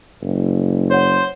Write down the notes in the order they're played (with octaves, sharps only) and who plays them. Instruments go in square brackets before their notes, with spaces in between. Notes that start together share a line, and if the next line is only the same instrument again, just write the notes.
[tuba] F#1
[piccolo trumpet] C5 [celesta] C#5 F#5